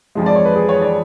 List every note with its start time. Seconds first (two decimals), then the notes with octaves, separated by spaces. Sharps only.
0.15 F2 F3 G#3
0.26 D5
0.35 C#5
0.45 B4
0.55 G#4
0.69 C#5
0.81 D5